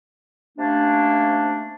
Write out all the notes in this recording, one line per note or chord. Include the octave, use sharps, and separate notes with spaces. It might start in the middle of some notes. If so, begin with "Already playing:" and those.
C3 A3 A#3 C#4 D4